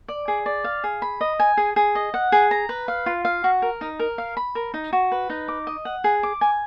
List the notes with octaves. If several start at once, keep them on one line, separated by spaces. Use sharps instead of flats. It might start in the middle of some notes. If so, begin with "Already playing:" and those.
D5
G#4
D5
F5
G#4
B5
D#5
G#5
G#4
G#4
D#5
F#5
G#4
A#5
B4
F5
F4
F5
F#4
A#4
D#4
A#4
F5
B5
A#4
D#4
F#4
B4
D#4
D6
D#5
F#5
G#4
D6
G#5